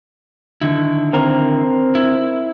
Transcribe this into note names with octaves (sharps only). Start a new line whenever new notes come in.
D3 D#3 E4
C4 A#4
E4